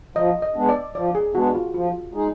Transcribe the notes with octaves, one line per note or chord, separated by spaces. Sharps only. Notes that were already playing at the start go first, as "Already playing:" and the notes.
F3 D#5
D#5
G#3 B3 D4
D5
F3 D5
G#4
G#3 B3 D4 F#4
F4
F3 F4
G#3 D#4 G#4